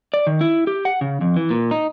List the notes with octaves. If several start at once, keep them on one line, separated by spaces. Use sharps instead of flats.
D5
D#3
E4
G4
F#5
C#3
F2
E3
A#2
D#4